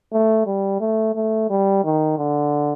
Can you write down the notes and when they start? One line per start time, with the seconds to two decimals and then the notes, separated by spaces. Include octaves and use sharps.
0.13 A3
0.46 G3
0.80 A3
1.15 A3
1.50 G3
1.84 D#3
2.18 D3